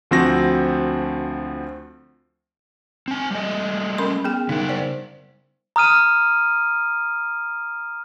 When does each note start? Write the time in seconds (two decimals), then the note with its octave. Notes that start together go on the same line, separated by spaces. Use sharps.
0.11 D2 F3 C4 F#4 A#6
3.08 C4 G#5
3.31 G3 A3 D#5
3.98 C#4 A#4 C6
4.24 B3 G#4 G5
4.49 C#3 G3 D#4 A#4
4.69 C5 D5
5.76 A#5 D#6 F6 D#7